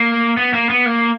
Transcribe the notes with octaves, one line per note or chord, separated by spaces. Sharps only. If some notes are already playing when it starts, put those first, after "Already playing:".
Already playing: A#3
B3
A#3
B3
A#3